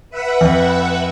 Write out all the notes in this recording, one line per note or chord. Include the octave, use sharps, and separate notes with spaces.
B4 E5 F#5
F2